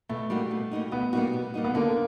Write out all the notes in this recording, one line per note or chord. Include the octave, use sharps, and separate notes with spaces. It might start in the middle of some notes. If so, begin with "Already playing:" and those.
B2 A3
G3 A#3 D#4 F#4
B2
G3 A#3 D#4 F#4
B2 B3
G3 A#3 D#4 F#4
B2
G3 A#3 D#4 F#4
B3
D3 A#3